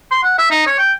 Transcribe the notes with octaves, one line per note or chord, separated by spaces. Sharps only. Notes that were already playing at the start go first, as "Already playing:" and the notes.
C6
F#5
E5
D#4
C#5
G5